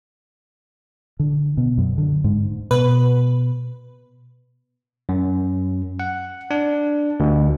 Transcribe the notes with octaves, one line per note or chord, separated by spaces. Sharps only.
D3
B2
F#2
D3
G#2
B2 B4
F#2
F#5
D4
D2